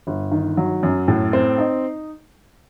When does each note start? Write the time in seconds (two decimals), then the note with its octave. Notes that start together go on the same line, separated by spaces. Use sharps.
0.07 G1
0.31 D#3
0.57 F#3
0.83 F#2
1.08 A2
1.33 C4
1.58 D#4